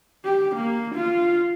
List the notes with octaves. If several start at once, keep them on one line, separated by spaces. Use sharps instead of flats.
G4
A#3
F4